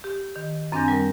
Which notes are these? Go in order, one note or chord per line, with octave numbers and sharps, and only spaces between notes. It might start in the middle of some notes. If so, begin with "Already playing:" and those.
G4
D#3
F#2 C4 D4 G#5 G6 A#6
G3 A#4 A#6